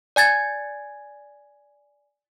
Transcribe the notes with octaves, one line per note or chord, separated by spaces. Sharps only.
D5 G#5 G#6 A6